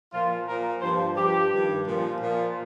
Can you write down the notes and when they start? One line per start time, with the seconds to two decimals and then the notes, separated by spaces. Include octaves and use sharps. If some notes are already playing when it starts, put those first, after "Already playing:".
0.12 A#2 F3 F4
0.47 A#2 F3 A#4
0.81 G2 F3 C5
1.16 G2 F3 G4
1.51 G2 D#3
1.86 A#2 F3
2.20 A#2 F3